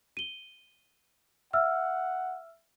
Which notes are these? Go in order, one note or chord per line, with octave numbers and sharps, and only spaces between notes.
D#7 G7
E5 F#5 E6 F6